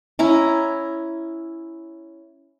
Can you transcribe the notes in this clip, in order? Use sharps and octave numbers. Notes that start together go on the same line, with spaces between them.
C#4 E4 A#5